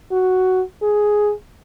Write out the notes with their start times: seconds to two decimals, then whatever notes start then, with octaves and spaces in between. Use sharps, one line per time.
0.12 F#4
0.82 G#4